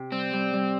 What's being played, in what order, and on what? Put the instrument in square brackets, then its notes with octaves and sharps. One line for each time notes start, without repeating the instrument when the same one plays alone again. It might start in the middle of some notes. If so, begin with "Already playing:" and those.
Already playing: [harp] C3
[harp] G3 [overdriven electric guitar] C4
[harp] G3
G3